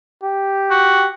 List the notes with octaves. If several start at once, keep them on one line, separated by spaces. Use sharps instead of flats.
G4
F#4